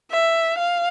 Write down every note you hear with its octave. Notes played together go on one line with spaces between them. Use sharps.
E5
F5